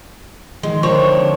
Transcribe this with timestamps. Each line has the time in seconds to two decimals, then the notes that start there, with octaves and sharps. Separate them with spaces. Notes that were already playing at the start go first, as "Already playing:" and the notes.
0.63 D#3 F3 G#3
0.83 D3 C4 D4 F4 A#4 C#5